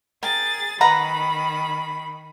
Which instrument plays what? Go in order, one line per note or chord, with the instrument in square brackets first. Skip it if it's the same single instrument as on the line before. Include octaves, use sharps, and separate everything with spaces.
[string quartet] G#4 A6 [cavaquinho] A#4 G5
[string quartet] D#3 B5 [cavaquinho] B4 F#5 A#5